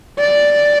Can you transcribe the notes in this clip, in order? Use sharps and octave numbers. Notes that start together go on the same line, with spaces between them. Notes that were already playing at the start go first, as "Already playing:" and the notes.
D5